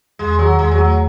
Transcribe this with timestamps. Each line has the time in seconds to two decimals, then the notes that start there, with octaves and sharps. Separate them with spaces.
0.19 E2 G#3
0.39 D#3 F#3
0.58 E2 G#3
0.71 F#3
0.78 A3
0.85 F#3